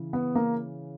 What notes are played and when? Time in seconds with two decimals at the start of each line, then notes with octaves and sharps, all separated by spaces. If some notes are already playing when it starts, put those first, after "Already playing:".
Already playing: C#3 E3
0.13 B3
0.35 A#3